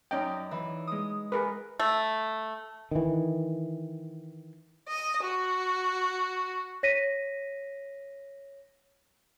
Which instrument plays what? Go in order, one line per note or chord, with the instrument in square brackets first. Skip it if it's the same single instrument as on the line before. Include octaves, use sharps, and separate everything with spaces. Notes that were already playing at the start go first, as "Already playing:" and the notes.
[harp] F#2 D#4 D5 [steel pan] C#4 D#5 G5
[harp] E3
G#3 D#6
[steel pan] G#4 A#4 B4
[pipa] A3
[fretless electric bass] D#3 E3
[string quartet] D#5
F#4
[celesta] C#5 A#6 B6 D#7